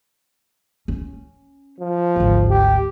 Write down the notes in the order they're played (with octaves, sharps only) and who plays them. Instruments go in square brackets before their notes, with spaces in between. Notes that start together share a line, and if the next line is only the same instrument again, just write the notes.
[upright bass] C#4
[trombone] F3
[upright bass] G#1 D2
[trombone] G4